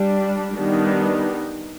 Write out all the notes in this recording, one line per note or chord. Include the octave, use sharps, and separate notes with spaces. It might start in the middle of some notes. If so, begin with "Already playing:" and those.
Already playing: G3 D4
D#3 G3 B3 D4 D#4